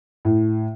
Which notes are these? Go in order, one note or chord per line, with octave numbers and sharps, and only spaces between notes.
A2